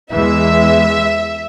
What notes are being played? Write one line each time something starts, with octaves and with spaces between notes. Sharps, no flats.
E2 E3 G#3 E5